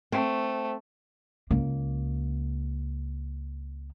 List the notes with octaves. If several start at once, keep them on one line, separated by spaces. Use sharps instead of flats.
A3 C4
C#2 A#3